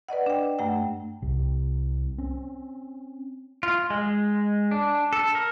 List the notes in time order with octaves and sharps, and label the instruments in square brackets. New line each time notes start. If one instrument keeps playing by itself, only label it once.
[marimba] B4 D5 D#5 F#5
D4 G5
G2 A3 F#5 G5
[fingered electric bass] C2 C3
C4 C#4
[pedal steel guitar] F4
G#3
D4
A4
A#4